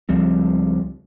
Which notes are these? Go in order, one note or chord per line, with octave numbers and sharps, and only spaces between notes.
C#2 F3 G3 C4